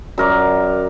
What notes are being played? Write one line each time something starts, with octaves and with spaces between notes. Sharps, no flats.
F#2 A#4 D5 D6